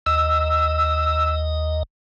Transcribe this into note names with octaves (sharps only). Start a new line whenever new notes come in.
D#2 D#5 E6